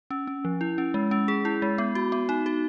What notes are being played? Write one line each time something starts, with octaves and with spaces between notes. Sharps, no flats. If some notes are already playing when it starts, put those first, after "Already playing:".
C#4
C#4
F3
E4
C#4
G#3
C#4
G#4
E4
G#3
B3
F#4
B3
D#4
F#4